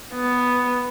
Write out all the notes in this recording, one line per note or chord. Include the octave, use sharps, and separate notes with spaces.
B3